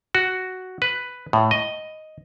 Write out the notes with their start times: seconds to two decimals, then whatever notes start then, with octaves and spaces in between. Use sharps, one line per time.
0.15 F#4
0.82 B4
1.33 A2
1.51 D#5